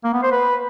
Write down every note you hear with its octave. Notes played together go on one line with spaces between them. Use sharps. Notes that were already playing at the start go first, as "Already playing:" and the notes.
A#3
B3
C5
B4